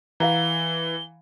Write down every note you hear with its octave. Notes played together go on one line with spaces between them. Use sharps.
E3 F5 F#5 A#5 G7